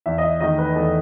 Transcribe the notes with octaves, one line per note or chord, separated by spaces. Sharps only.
E2 E5
D#5
E5
D#3 A3 D#5
B4
E2 A4